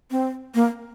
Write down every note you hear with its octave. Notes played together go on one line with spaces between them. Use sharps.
C4
A#3